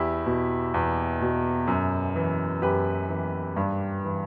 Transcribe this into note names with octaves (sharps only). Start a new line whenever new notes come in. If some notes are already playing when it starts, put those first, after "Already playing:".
Already playing: E2 E4 G4
B2
E2
B2
F#2
E3
F#2 G4 B4
E3
G2
E3